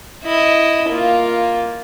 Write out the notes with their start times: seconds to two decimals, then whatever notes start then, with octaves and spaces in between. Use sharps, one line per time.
0.24 E4 D#5
0.89 A#3 F4